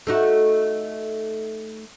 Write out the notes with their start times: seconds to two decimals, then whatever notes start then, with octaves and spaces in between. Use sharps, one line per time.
0.07 A3 D#4 F#4